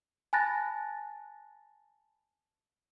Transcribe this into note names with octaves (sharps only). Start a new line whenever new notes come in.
G#5 A5 B5 F#6 A6 A#6